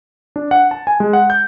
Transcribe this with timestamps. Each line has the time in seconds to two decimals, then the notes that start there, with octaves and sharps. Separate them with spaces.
0.36 D4
0.51 F#5
0.71 A5
0.87 G#5
1.00 G#3
1.13 F#5
1.30 G6